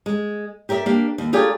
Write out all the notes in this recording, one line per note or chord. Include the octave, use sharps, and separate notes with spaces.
G#3
G4 A#4 D5 E5
A#3 D4 G4
D#2
A3 F4 G4 G#4 A#4 D5